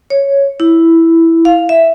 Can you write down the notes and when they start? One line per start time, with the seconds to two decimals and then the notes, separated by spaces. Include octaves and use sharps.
0.10 C#5
0.60 E4
1.45 F5
1.69 E5